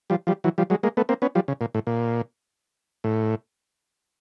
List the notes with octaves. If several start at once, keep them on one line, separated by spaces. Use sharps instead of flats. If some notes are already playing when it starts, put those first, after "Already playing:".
F3 G3
F3 G3
E3 F#3
F3 G3
F#3 G#3
G#3 A#3
A3 B3
A#3 C4
B3 C#4
F3 G3
C#3
A#2
A2
A#2
A2